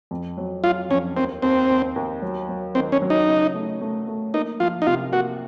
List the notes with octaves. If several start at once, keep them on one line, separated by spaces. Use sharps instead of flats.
F2
F#3
F#3 F4
F2 C#4
D#2 C4
D#2 C4
D#2
D#2
F#3
F#3
D#3 C4
C#4
F#3
D#4
C#3
A3
A3
A3
A#3 D#4
F3 F4
D#4
C3 F4
A#3 F#4